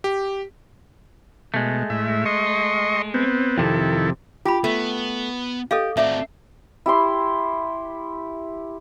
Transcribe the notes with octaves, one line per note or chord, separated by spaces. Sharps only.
G4
B2 G#3 A3
A2 E5
D#5 C6 C#6
B3 C4
F2 C3 D#3 E4 A4
F4 G4 B5
A3 B3
G4 A4 D#5 F5
A3 C4 F#4 D5 E5
E4 G4 C6